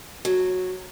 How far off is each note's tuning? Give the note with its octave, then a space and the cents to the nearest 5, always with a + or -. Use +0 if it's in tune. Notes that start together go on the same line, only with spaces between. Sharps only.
F#3 -10